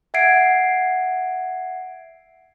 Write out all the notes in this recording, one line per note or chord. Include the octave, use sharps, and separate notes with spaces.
E5 F#5 G#6 C7 D7